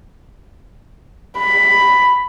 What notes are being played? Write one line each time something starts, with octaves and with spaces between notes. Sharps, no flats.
B5